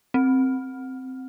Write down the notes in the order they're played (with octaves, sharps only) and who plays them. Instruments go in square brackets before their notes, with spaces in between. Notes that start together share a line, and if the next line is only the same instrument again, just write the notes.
[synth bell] C4